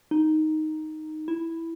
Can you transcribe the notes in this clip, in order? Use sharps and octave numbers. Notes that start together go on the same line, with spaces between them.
D#4
E4